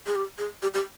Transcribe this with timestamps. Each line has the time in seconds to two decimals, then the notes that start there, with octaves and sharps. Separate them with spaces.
0.07 G#4
0.16 G4
0.38 G#4
0.62 G4
0.74 G4